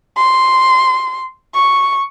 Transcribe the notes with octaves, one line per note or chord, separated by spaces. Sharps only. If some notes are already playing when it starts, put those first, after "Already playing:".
C6
C#6